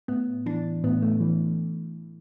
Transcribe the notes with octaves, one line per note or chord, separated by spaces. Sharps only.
A2 B3
E3 D4
A2 B3
A3
E3